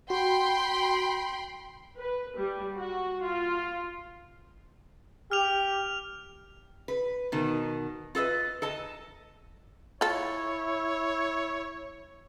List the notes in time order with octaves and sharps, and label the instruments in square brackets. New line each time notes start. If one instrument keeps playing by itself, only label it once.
[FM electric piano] F#4 [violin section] G5 B5 C6
[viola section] B4
G3
F#4
F4
[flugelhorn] G4 [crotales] F6 F7
[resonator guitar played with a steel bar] B4
B2 D#3
F4 A4 B4 D#5
A4 D#5 A5
[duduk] E4 [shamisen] F4 A4 [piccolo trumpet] C#5